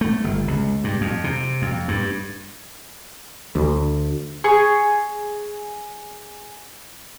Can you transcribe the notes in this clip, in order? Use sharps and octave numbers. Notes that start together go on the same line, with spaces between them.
A3
G1
C#2
G2
F2
C3
F2
G2
D2
G#4 C#6